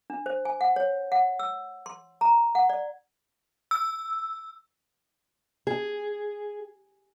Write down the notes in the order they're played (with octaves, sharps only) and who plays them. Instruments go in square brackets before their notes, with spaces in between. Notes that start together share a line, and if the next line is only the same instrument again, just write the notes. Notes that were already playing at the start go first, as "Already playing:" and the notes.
[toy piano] D4
C5
G#5
F#5
C#5
F#5
E6
C6
A#5
F#5
D5
[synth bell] E6
[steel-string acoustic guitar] G#4